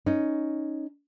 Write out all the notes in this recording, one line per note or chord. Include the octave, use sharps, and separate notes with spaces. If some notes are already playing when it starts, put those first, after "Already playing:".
C#4 D#4